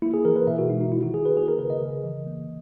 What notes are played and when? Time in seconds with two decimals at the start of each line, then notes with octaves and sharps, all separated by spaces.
0.02 A#3 E4
0.14 G#4
0.25 E3 A#4
0.36 B4
0.47 B2 E5
0.59 F#4
0.70 G#3 D#4
0.81 D#4
0.92 D#3 E4
1.03 F#4
1.14 D#3 G#4
1.25 B4
1.36 A#3 G#4
1.48 A#4
1.59 C#3 B4
1.70 D#5
1.81 C#3
2.04 E3
2.26 A#3